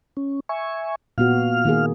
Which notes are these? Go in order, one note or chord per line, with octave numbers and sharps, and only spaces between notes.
C#4
E5 G#5 C#6
A#2 B3 F#4 F5 F6
D#3 A#3 G#4